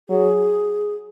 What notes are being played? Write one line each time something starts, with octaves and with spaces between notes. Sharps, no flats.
F#3 G#4